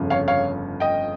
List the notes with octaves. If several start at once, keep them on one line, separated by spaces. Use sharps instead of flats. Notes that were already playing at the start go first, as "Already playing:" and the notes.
Already playing: G1 F2 C#3
C#5 F5
C#5 F5
D#5 G5